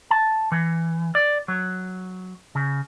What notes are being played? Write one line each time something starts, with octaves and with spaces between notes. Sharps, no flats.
A5
E3
D5
F#3
C#3